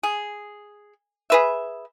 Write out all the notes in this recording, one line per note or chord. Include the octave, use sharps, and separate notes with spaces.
G#4
G#4 B4 E5